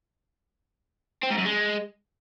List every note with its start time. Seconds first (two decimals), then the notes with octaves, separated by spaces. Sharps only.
1.23 C4
1.30 G#2
1.38 F#2
1.45 G#3